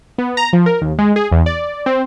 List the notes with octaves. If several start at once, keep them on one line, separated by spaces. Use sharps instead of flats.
B3
A#5
F3
A#4
D#2
G#3
G#4
E2
D5
C4